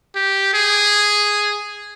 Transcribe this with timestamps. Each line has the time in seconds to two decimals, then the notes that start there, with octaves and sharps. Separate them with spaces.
0.16 G4
0.54 G#4